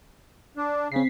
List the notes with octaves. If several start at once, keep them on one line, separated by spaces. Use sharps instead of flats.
D4
C#3 C4 B6 C7